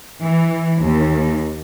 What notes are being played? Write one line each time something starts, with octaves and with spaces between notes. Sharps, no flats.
E3
D#2